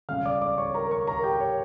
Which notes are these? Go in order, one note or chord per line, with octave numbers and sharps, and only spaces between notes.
C#2 C#3 G3 C#4 F5 F6
D5 D6
D5 D6
C#5 C#6
A#4 A#5
C#5 C#6
A#4 A#5
G4 G5
C#5